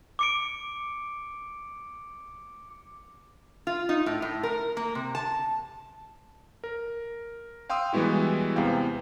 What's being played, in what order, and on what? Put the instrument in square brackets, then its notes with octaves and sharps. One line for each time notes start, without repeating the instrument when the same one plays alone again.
[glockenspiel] D6 C#7 D7
[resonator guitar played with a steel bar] F4
D#4
A2
A2
A#4
A#3
C3
A5
[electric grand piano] A#4
F5 G5 C6 D#6 E6
E3 G3 G#3 B3 E4 F#4
E2 C3 B3 F5 G5